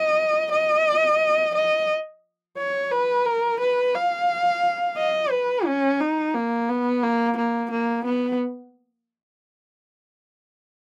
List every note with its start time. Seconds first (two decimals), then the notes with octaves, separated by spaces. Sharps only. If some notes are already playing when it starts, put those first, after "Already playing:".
Already playing: D#5
0.51 D#5
1.55 D#5
2.58 C#5
2.92 B4
3.26 A#4
3.60 B4
3.95 F5
4.97 D#5
5.31 B4
5.66 C#4
6.00 D#4
6.34 A#3
6.69 B3
7.03 A#3
7.37 A#3
7.71 A#3
8.05 B3